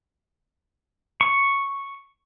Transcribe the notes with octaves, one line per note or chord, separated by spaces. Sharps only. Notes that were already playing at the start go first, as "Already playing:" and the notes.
C#6